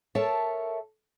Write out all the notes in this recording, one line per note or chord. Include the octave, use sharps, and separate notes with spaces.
A4 A#4 C#5 E5 A5